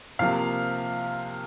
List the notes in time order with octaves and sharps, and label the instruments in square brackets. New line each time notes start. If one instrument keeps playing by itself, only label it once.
[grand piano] C3 F3 A#3 F5